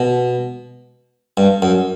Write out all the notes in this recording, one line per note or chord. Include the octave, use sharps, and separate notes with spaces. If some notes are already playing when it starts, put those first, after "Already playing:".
Already playing: B2
G2
F#2